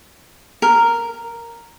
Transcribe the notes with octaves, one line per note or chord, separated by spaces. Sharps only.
A#4